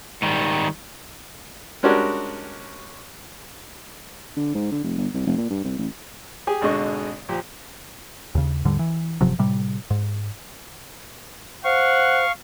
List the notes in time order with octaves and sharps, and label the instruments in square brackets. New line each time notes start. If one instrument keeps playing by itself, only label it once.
[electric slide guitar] G#2 D#3 G3
[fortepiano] G3 G#3 C#4 D4 F#4 A#4
[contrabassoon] D3
G#2
D3
F1
G1
C2
F1
A#2
G2
C2
A1
[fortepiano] G4 G#4 G#5
G#1 B2 D3 G#3 D#5 C#6
A#2 F3 G4
[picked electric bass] D#2 C#3
D#2 G#2 D3 G3
E3
G1 C3 F3 F#3
A2 C3 G3
G#2
[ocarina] C5 [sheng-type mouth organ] F5 C#6 [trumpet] F#5